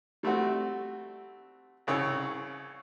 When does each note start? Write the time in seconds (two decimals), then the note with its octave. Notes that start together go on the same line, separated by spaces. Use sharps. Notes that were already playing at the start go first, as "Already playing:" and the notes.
0.23 G3 A3 C4 F#4
1.87 C2 C#3 C#5 E6